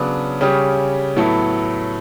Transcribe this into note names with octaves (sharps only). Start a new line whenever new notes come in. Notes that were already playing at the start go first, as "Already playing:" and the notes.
Already playing: C#3 F#3 B3 D4
C#3 G3 C#4 G4
A2 F#3 B3 E4 A4